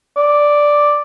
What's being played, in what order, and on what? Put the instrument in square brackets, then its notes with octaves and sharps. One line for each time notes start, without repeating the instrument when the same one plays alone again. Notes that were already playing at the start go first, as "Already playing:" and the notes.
[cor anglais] D5